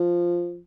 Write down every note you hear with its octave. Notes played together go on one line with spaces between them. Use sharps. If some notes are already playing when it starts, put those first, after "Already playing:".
Already playing: F3